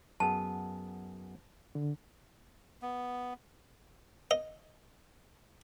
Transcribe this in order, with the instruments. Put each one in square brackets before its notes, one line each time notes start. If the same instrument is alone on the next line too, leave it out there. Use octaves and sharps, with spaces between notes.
[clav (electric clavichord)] F#2 B3 G#4 [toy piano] A5
[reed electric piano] D3
[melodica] B3
[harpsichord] D#5